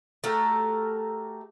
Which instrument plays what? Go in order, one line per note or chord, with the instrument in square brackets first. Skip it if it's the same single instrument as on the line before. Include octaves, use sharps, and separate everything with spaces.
[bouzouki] A3 F#4 G4 A#4